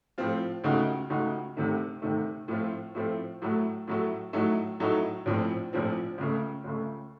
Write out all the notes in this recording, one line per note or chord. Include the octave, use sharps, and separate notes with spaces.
A2 F3 C4 F4
C#2 C#3 A3 D#4 F#4
C#2 C#3 A3 D#4 F#4
C2 C3 D#3 A3
C2 C3 D#3 A3
A2 F3 A3 C4 F4
A2 F3 A3 C4 F4
A2 F#3 A3
A2 F#3 A3
A2 F#3 A3 D#4
A2 F#3 A3 D#4
A#1 A2 F3 C4
A#1 A2 F3 C4
C#2 C#3 A3
C#2 C#3 A3